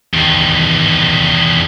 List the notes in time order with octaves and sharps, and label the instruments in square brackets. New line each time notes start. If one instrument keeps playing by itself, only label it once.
[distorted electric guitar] E2 D#3